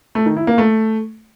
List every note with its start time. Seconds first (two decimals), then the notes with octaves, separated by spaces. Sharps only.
0.15 A3
0.26 D#3
0.37 E4
0.47 A#3
0.58 A3